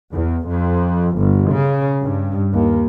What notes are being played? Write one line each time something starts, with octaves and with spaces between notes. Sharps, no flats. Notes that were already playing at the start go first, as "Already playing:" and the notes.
E2
F2
G1
C#3
G2
D#2